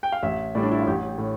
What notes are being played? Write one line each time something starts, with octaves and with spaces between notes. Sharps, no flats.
G5
F5
A1 E5
A2 G3 D5
D4
E4
F4
A1 G4
G4
A2